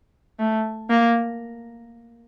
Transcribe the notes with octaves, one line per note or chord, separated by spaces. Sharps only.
A3
A#3